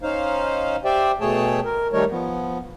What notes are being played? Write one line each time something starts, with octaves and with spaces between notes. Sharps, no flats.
C#4 D#4 C5 F5
G4 C5 D5 E5 G5
B2 A3 G#4 C#5 G5 A5
A#4
D#3 G3 A3 D#4 A#4 C#5
F3 B3